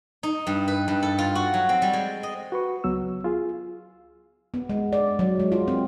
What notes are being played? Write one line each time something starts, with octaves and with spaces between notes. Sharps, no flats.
D#4
G2
B4
G2
A4
F4
F#4
F#3
C4
G3
G#3
D#5
F#4 B4 C#6
C#2 F#3 B3 E6
F4 G#4
B3
G#3
D5
F#3
G#3
F4
C4